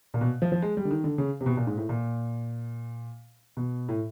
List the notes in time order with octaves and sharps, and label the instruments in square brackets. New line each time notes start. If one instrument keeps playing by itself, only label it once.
[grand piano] A#2
B2
F3
F3
G#3
G3
D3
D#3
D3
C#3
C3
B2
A#2
G#2
A2
A#2
B2
A2